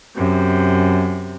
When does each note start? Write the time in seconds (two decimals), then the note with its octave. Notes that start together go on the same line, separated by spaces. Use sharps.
0.15 F#2 C3